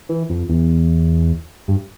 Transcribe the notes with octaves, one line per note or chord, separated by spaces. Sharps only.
E3
F2
E2
G2